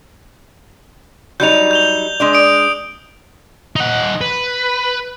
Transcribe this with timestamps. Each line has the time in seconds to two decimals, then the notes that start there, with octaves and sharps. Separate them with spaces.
1.40 F#3 G3 D#4 G6 F7
1.71 G6 F7 G7
2.20 G#3 D4 D5
2.33 D#6 D7
3.76 D#4 F#5
4.21 B4